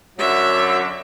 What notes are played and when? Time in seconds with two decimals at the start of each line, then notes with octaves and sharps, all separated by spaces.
0.19 F#2 D3 F#3 E5